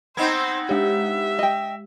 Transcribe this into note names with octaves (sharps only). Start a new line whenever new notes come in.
B3 C4 D#4 C5 B5 G#6
G#3 G4 E5
D#5 G5